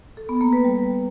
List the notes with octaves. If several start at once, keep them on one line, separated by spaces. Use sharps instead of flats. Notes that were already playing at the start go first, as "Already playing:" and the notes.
A4
B3
A#3
B4
G3